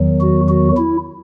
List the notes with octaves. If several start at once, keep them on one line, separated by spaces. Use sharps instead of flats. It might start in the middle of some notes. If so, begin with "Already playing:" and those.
Already playing: E2 D#3 F#3
F#4
F#4
E4